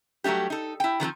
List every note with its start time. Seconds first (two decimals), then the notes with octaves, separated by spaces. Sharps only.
0.24 F#3 G3 A3 D#4 G4
0.50 D#4 A4
0.80 E4 G5
1.00 D#3 F3 B3 C4